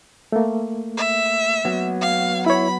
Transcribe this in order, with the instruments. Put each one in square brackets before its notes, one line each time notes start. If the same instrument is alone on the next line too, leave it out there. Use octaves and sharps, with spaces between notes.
[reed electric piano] A3 A#3
[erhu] E5
[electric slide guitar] F#3 B3
[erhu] F5
[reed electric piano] E4 C#5 [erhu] B5